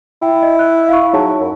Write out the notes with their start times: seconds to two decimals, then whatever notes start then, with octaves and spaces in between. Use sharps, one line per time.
0.22 E4 G5
0.43 D#5
0.59 F#6
0.89 F5 C#6
1.13 F#3 D#4 G#4 A5
1.40 F#2